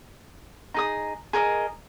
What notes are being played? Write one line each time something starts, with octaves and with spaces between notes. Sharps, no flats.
D#4 G#4 D#6
G#4 A#4 D#5